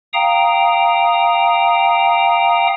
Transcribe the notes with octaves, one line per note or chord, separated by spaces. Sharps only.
F5 G5 A#5 D#6